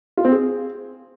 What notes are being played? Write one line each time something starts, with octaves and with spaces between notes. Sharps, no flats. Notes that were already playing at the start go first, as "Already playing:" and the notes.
F4
C4
G#4